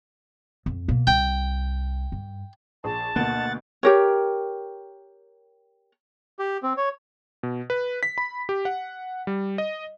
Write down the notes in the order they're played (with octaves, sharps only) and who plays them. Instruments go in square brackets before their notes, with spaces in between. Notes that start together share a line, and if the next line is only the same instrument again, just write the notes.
[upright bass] F2
B2 A#3
[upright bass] C2 [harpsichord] G5
[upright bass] G2
[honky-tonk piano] A#1 G#4 [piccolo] A5
[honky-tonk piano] D2 B2 [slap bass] A#3 [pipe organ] F#5 A6
[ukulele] G4 A#4 C#5
[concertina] G4
C4
C#5
[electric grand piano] B2
B4
B6
B5
G4
F#5
G3
D#5